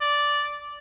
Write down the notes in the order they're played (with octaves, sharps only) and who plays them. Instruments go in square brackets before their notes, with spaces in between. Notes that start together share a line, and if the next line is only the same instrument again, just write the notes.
[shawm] D5